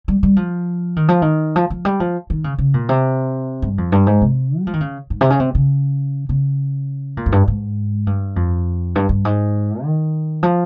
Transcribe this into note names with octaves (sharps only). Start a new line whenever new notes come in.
G3
G3
F3
D#3
F3
D#3
F3
F3
G3
F3
D#3
C#3
C#3
A#2
C3
G2
F2
G2
G#2
C3
G3
F3
D#3
C#3
G#2
C3
C#3
C3
C#3
C#3
A#2
F2
G2
G#2
G2
F2
G2
G2
G#2
D#3
F3